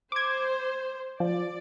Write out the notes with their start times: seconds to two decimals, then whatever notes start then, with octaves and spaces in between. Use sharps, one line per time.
0.12 C5 D6 G#6
1.20 F3 D5